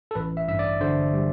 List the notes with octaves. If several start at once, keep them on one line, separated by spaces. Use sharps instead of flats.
A4
A1 B4
E5
G2 E5
D5
D3 C5
G3